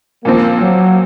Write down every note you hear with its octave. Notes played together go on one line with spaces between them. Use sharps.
A#2 F3 A#3 C4
F#3